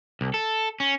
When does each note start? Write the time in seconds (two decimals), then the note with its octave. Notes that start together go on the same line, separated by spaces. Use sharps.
0.21 C2
0.34 A4
0.80 C#4